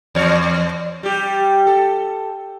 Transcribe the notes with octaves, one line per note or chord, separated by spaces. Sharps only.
E2 C#5
G3 G4
A4